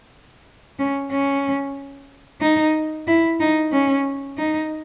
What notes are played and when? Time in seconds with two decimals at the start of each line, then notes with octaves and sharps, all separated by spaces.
0.79 C#4
1.11 C#4
2.41 D#4
3.07 E4
3.40 D#4
3.72 C#4
4.37 D#4